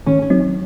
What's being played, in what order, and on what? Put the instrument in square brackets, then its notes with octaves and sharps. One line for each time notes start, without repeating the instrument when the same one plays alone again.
[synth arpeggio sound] D#3 [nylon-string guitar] C#4
[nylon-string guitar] C#4
[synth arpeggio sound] F#3 C4 D#4